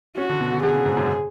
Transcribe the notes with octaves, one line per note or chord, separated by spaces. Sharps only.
C#4 F#4
D3
B2
D3
D3 G#4
C#3
G#2
F#2